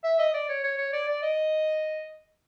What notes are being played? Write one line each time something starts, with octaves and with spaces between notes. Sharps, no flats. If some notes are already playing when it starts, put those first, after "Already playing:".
E5
D#5
D5
C#5
C#5
C#5
D5
D5
D#5